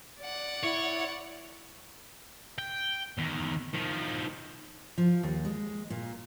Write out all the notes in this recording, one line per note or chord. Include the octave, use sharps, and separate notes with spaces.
D5 F#5
E4 C#5
G5
E2 D#3
D#3 F3
F3
D#2
G#3
A#2